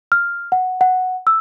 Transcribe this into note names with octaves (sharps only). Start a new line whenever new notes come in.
F6
F#5
F#5
E6